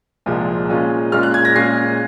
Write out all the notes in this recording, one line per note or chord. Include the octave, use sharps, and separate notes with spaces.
C2 A#2 F3 G#3
A#2 G#3 C#4 F4
A#2 G#3 C#4 F4 F6
F#6
G#6
A#6
A#2 G#3 C#4 F4 C7